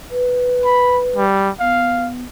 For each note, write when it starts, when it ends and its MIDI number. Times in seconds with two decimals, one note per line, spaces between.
0.11 1.23 71
0.65 0.99 83
1.16 1.50 55
1.60 2.24 59
1.60 2.09 77